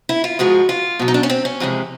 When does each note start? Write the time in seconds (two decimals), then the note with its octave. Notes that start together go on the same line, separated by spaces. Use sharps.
0.09 E4
0.24 F4
0.39 G#2 F3 G#3 F#4
0.69 F4
0.99 B2 F#3
1.08 D#4
1.14 D4
1.23 C#4
1.29 C4
1.45 C#4
1.60 F2 C3 E3 G#3